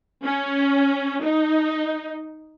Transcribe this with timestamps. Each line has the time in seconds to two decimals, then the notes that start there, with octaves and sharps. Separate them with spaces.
0.24 C#4
1.22 D#4